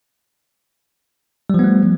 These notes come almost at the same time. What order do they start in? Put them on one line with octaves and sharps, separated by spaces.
G3 F3 B3 A3